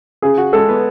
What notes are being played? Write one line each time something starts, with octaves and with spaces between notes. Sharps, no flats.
C#3 G#4
F#4
G#3 A4
B3